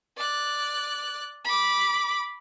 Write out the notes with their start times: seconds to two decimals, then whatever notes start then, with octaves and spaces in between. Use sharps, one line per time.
0.17 D5 F#6
1.44 B5 D6